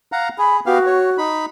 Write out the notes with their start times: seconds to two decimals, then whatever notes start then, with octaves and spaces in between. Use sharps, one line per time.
0.12 F5 F#5 A#5
0.38 G#4 B5
0.66 B3 F#4 G4 F5
0.86 C#5
1.18 D#4 B5